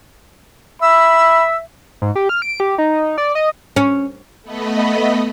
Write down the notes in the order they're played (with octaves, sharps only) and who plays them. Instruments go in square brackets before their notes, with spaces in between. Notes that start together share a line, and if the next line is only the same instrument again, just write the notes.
[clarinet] E5 [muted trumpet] B5 [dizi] E6
[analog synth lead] G#2
G4
F6
D7
G4
D#4
D5
D#5
[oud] C#4
[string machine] A3 B3 B4 D#5